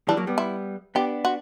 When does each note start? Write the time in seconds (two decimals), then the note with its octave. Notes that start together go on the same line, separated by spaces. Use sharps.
0.08 E3 G3 D4
0.17 F#3 A#3
0.27 G3 B3
0.38 E4
0.95 B3 D4 G4
1.25 F#4